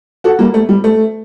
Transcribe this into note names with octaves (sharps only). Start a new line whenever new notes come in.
F#4 A4
G3 A#3
A3
G3
A3